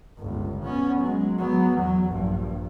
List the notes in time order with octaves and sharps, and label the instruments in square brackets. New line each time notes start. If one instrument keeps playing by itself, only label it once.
[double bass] G1 C#2
B3 C#4
F#3 G#3
F#3 B3
E2 F#3
A#1 G2